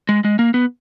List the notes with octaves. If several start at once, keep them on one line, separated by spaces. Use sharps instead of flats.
G#3
G#3
A#3
B3